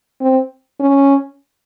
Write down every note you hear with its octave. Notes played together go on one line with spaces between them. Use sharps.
C4
C#4